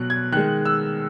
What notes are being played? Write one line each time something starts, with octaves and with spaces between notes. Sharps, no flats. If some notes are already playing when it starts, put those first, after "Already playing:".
Already playing: B2 F#3 F#6
G#6
D#3 G#3 F#6
E6